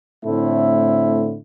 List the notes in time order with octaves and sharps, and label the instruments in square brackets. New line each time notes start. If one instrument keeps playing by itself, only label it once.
[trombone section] A2 D3 A3 C4 E4